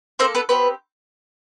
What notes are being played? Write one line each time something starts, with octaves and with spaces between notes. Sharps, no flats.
A#3 C4 A4 C5
B3 B4
B3 C4 G4 B4